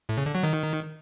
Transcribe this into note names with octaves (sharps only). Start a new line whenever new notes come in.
A2
C#3
D3
F#3
D#3